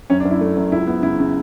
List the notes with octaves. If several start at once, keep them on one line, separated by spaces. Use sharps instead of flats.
F#2 C#4
D4
F#2
E4
A3
F#2
C#2 E4
B3
C#3 E4
C#3